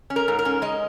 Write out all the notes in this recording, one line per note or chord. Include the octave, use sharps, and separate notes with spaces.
C#4
A#4
G#2
A#4
C#4
G#3 D#5